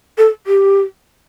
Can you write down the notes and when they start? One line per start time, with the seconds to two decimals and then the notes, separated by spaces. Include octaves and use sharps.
0.18 A4
0.47 G4